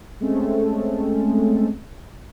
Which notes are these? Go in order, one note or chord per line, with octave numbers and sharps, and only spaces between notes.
G#3 A3 C4 C#4 A4